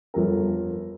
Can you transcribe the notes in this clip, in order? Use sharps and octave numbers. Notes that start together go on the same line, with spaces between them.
G1 F2 A4 A#4